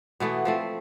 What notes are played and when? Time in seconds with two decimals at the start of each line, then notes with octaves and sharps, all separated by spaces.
0.20 B2 E3 A3 B3
0.45 F3 A3 C4